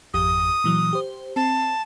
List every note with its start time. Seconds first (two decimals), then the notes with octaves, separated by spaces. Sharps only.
0.14 G#1 F2 G4 D#6
0.64 A#2 E3 F#3
0.93 G4 C5
1.36 C4 A5